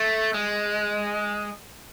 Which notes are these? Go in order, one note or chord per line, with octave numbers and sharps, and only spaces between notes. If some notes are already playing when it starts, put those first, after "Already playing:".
Already playing: A3
G#3